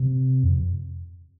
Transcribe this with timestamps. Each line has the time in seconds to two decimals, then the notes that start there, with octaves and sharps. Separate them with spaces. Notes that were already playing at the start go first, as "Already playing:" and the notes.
Already playing: C3
0.44 F2